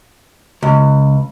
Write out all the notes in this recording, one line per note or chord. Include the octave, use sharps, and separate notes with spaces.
C#2